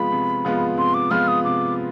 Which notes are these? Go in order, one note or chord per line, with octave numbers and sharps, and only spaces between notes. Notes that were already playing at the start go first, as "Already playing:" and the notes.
Already playing: C3 F3 G#3 B3 F4 B5
C3
F3 G#3 B3 F4
C3 C6
D6
F3 G#3 B3 F4 F6
D#6
C3 D6